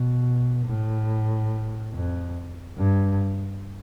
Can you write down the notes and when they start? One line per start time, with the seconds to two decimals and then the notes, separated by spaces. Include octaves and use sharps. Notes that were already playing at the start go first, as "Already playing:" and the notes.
Already playing: B2
0.65 A2
1.93 F2
2.77 G2